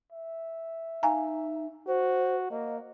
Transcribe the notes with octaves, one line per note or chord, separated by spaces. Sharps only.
E5
D#4 F5 G#5 A#5
F#4 C5
A#3 D#5